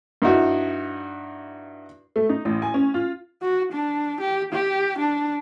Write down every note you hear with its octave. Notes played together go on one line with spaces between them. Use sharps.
G2 D#4 E4 F#4
A3
D#4
A1
G#5
C#4
F4
F#4
D4
G4
G4
D4